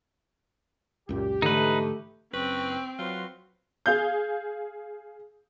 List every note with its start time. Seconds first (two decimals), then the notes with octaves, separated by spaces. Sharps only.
1.09 C#2 F#2 A#2 G4
1.42 G#2 D3 E3 A3 D#4 B4
2.33 F#1 C4 B4 C#6
2.99 F#3 F4 F#4 B4 C5
3.86 G#4 F5 G6